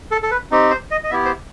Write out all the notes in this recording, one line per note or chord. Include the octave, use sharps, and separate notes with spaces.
A4
A4
B4
C4 D#4 G4
C5
D#5
D#5
B3 E4 G4 E5
C5